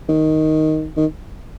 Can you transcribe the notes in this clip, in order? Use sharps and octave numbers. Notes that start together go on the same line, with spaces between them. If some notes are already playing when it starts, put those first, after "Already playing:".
D#3
D#3